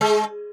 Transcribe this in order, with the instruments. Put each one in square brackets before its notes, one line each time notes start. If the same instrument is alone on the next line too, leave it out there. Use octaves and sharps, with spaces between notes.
[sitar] G#3